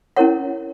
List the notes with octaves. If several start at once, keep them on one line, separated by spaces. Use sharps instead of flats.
C#4 E4 A#4 C#5 F#5